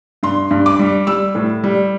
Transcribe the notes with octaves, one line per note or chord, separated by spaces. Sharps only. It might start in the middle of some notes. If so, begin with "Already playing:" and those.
G2 C6
G2
D6
G3
G3 E6
A2
G3